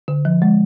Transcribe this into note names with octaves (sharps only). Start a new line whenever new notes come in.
D3
F3
G#3